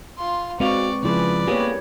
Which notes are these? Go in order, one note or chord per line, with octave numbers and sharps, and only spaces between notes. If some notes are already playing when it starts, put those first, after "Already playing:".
F4 C6
G#3 C4 F#4 B4 D5 D#5 F5 C#6
C#2 F3 C#4 E4 G#4 B4 D5
A#3 B3 G4 G#4 C#5